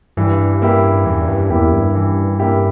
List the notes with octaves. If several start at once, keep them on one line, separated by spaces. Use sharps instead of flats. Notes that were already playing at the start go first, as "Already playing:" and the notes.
G2 E3
A#3 E4 G4
E2 E3
G2
E2 A#3 E4 G4
G2
E3
A#3 E4 G4